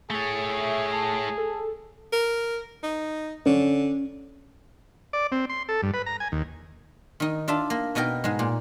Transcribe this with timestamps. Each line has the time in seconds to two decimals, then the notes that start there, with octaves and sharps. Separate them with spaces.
0.10 A3 G#4 C#5 A6
0.46 E5
0.93 A5
1.38 A4
2.12 A#4
2.83 D#4
3.46 D3 C#4
5.13 D5
5.32 C4
5.49 C6
5.69 A4
5.82 G2
5.94 B4
6.06 A#5
6.20 G#5
6.32 D#2
7.20 D#3 D#4
7.48 D4 F4 A4 E5 A5
7.70 A#3
7.95 B2 B3 D#4 A#4 G5
8.24 G#2 G#3
8.39 A#2